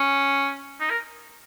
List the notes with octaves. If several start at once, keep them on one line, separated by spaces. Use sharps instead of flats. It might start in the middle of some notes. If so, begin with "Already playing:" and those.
Already playing: C#4
D#4
A#4